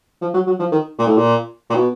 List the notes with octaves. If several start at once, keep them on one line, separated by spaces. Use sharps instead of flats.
F3
F#3
F#3
F3
D#3
A#2
A2
A#2
A#2
B2